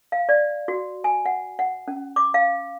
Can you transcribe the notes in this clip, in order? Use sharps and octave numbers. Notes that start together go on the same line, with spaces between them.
F5
D5
F#4
G#5
F#5
F#5
C#4
D6
F5